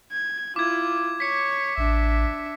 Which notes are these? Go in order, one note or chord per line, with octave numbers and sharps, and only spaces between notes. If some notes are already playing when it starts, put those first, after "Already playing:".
G#6
E4 F4 D6 G#6
C#5 B6 C#7
A1 D4 E5